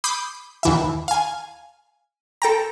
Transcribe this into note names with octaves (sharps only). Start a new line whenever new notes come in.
B5 D6 D#6 G6 C7
D#2 E3 E5
F5 G#5
A4 G5 A#5